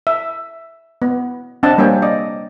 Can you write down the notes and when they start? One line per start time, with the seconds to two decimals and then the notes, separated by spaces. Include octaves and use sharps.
0.07 E5
1.02 B3
1.63 C4 D4 D#5 F#5 A5
1.78 G3 A#3 D4 C#5 G5 G#5
2.02 D5 D#5